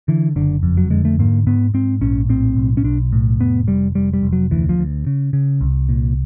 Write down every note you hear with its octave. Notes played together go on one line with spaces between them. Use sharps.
D3 E3
F#1 D3
F2
F#3
D3 G#3
A3
G#2 A#3
G#2 B3
G#2 C4
A#1 C#4
A2 C4
B1
C#4
B1 D4
A2
F1 B3
F1 G3
F1 G3
G3
F1
F#3
D2 E3
F3
D2
C#3
C#3
C2
A#2